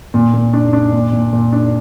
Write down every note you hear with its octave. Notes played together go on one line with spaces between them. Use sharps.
A#2
A#2
D4
D4
A#2
A#2
A#2
D4